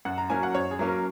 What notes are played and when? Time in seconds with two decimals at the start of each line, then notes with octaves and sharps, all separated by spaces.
0.05 F#2 F#5
0.18 A#5
0.30 F#3 A#3 C#4 G#5
0.43 F#5
0.55 F#2 C#5
0.71 G#4
0.79 F#3 A#3 C#4
0.88 A#4